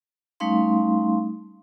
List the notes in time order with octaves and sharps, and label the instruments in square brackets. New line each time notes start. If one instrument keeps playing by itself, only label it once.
[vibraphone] G3 A3 C#4 D#4 F5 C6